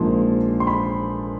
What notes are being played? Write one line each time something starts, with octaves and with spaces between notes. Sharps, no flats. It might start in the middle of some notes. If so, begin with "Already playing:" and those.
Already playing: A#1 G#2 F3 A#3 C6
C6
B5